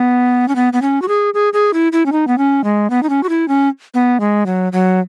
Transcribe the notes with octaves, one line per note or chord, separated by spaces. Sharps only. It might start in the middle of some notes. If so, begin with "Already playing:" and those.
Already playing: B3
C#4
B3
B3
C#4
F#4
G#4
G#4
G#4
E4
E4
C#4
D#4
B3
C#4
G#3
B3
D#4
C#4
F#4
E4
C#4
B3
G#3
F#3
F#3